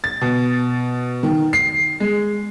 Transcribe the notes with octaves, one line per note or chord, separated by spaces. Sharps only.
A6
B2
D#3
C7
G#3